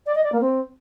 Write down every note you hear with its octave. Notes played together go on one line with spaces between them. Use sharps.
D5
D#5
D5
A#3
C4